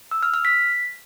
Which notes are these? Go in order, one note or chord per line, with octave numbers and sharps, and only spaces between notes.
E6
F6
F6
B6